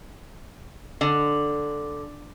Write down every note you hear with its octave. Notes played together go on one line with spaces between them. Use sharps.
D3